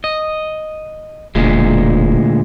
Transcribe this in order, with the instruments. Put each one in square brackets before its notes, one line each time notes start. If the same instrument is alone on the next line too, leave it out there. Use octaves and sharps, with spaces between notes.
[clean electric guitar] D#5
[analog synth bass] E1 [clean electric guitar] D2 A#2 G#3